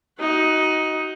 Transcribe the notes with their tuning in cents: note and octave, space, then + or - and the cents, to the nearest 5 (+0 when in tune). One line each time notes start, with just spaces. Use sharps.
D#4 +15 F#4 +20